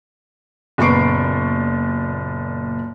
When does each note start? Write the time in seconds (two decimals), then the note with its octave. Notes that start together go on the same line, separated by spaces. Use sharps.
0.78 F#1 A#2 B3 C#6 C7 D7